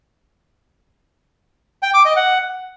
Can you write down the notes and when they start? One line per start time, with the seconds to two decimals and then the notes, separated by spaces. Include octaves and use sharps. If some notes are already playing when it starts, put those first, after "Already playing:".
1.83 G5
1.94 D6
2.05 D#5
2.16 F#5